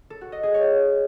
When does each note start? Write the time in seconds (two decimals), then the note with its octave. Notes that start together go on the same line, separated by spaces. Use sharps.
0.10 A4
0.21 F#4
0.32 D#5
0.43 G#4
0.54 C#5